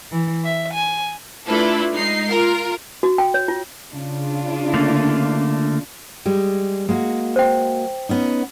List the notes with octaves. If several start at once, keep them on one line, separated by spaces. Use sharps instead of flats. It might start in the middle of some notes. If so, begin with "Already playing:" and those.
E3
E5
G#5
A3 D4 E4 F4 A4 B4
G#3 D#4 C7
F4 A#4
F#4
G5
C#5
F4
C#3 D4 F4
D3 A3 A#3
G3 G#3
G#3 A#3 F#4
C5 G5
B3 C#4 D#4